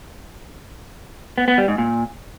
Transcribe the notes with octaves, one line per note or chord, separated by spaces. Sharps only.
B3
B3
G3
G#2
A#2